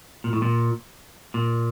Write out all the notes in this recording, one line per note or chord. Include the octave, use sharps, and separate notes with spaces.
A#2
A2
A#2
A#2